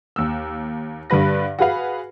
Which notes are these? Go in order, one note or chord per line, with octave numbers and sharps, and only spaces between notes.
D#2 E6
G2 D3 G3 B4 A#6
F#4 G#4 B4 F5